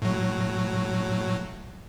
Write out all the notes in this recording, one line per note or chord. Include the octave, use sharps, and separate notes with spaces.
A2 F#3